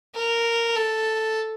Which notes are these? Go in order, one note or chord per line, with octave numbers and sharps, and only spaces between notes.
A#4
A4